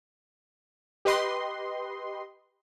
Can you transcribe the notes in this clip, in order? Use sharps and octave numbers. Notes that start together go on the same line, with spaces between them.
G4 B4 D#5 C6